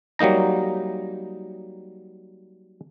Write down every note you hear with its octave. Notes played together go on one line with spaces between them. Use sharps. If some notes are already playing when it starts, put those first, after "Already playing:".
F#3 G3 A#3 D#4 A#5